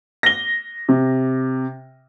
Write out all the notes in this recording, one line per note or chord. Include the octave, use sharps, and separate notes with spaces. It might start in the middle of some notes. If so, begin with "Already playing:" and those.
A#6 G7
C3